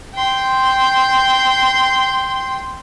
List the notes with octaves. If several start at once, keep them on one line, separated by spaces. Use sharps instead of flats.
G5 C6